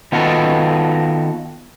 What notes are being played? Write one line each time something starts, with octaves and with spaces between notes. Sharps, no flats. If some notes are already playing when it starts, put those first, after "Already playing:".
D#3 B3 F4 F#4 A4